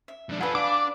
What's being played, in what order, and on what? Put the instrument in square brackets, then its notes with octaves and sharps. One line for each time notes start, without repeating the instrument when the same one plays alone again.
[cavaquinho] E5
[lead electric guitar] F2 D4
[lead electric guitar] F4 A4 [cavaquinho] B4 G#5 [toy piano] F#5 B5 E6
[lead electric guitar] D4 [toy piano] F5 F#5 [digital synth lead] D6